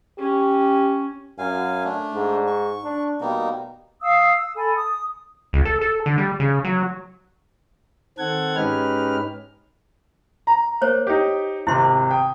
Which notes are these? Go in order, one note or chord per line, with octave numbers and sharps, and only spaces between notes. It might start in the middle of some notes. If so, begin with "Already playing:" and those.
C#4 G4
F#2 F5 G#5
A3 D4
G#2
C#6
D4
B2 G3 A#3 D#4
F5 D#6 E6
E6
A4 G#5 B5
D#6
C#2
A4
A4
D3
G3
C#3
F#3
D#3 C4 A4 F#5 G#6
G#2 C#4 D#4 G4 B4 F6
A#5
A#3 C5 C#5
D#4 G4
G#1 C3 E4 C6
G5 D#6